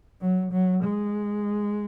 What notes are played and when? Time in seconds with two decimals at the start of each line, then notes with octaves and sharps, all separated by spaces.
0.21 F#3
0.52 F#3
0.84 G#3